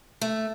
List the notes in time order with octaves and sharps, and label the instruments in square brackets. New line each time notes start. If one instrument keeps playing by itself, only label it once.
[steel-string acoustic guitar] A3